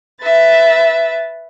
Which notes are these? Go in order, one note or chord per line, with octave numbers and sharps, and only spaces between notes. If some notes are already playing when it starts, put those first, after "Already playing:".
B4 E5 A6